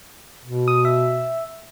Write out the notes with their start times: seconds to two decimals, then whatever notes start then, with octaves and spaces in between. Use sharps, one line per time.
0.44 B2
0.68 D#6
0.85 E5